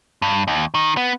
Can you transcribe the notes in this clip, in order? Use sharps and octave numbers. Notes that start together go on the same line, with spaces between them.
G2
D#2
D#3
B3